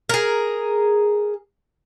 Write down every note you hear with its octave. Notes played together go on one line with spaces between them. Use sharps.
G#4 A#4